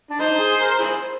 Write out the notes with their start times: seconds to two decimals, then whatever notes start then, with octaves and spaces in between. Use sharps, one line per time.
0.10 D4
0.20 D#4 C5
0.40 G#4
0.60 A#4
0.80 E4 G#4 C5